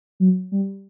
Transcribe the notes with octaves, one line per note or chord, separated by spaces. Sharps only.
F#3
G3